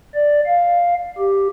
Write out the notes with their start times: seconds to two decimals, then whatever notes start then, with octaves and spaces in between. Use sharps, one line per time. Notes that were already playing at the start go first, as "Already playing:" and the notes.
0.15 D5
0.46 F5
1.18 G4